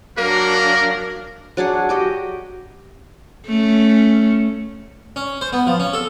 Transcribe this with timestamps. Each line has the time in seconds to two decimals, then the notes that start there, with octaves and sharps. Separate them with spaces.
0.18 F#3 A#3 D4 A#4
1.57 F#3 D4 G#4 F#5
1.89 F#4 G4 D#5
3.47 A3 C#4
5.16 C#4
5.41 C5
5.53 B3
5.67 F3
5.80 C#4
5.93 A4